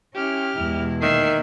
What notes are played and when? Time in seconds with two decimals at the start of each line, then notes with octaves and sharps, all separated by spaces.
0.15 C#4 E4 G4 F6
0.57 E2 B2 G#3 E4
1.02 D#3 A#3 E5 C7